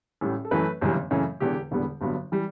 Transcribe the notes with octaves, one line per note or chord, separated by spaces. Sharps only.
A1 A2 G3
A4
F#2 E3 A3 B4
G1 F#2 C#3 E3 G3
F#2 C#3 E3 A3 C#5
E1 E2 D3 G4
E1 E2 D3 G3 B3
G1 G2 F#3 B3
E3 G3